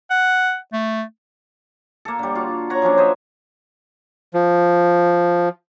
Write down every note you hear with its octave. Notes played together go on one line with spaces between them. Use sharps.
F#5
A3
A#3 A4
D3 G3
F4 F#4
C#5 F#5 A#5
F3 F#3 C#4 D4
C5 C#5 D#5 E5
F3